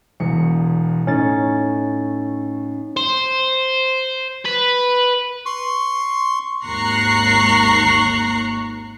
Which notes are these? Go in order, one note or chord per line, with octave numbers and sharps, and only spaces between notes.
E1 E2 C#7
A2 C#4 D#4 A6
C5
B4
C6 C#6
G#1 D#2 A#5 C#6 F#6 C7